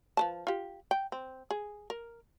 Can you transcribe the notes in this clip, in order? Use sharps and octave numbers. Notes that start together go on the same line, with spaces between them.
F3 B4 A5
F4 G4
G5
C4
G#4
A#4